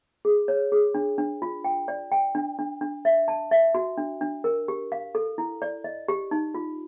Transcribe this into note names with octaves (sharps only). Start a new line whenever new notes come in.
G#4
C#5
G#4
D4
D4
F4
G5
D5
G5
D4
D4
D4
E5
A5
E5
F#4
D4
D4
A#4
G4
F5
A4
E4
D5
D#5
G4
D#4
F4